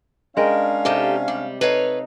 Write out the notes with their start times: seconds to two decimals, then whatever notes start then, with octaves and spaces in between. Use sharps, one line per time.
0.37 G#3 C#4 D4 A#4 F5 G5
0.85 C3 D#4 G4 A4
1.28 G3
1.61 D#4 A4 B4 C#5 F5